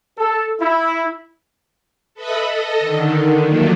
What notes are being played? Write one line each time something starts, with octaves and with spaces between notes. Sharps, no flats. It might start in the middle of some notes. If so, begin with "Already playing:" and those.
A4
E4
A4 B4 D#5 E5 B5 D#6
A4 D#5
D3 D#3
D#3 F3 F#3 A3 A#3